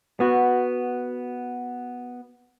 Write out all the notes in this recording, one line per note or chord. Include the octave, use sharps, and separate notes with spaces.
B3 F#4